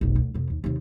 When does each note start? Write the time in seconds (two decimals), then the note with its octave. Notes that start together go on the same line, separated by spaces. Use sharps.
0.01 F1 B1
0.15 D2
0.34 F2 C3
0.50 D#2
0.64 D#2 C3